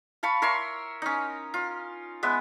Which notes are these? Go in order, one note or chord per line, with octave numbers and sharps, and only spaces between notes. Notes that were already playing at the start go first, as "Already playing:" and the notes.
F5 A5 B5 C#6
A#4 C#5 E5 C6
C#4 D#4
F4
G#3 B3 E5